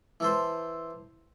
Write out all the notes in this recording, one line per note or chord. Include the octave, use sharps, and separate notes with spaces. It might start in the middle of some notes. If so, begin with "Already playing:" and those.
E3 A4 C5